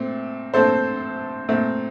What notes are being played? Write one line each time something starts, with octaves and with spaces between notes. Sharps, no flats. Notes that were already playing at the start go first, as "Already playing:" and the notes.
Already playing: A#2 A3 C4
A#2 A3 C4 A4 C5
A#2 A3 C4